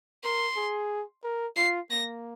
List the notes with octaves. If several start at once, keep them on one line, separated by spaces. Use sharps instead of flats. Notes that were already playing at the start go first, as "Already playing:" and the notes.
A#4 C6
G#4
A#4
F4 C7
A#3 A#6